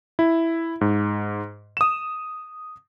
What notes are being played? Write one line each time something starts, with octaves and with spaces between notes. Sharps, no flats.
E4
G#2
D#6 E7